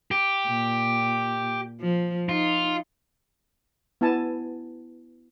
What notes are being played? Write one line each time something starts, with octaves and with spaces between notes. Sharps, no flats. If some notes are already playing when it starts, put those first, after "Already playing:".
G4
A#2
F3
D#4 F4
B3 E4 G#5 A5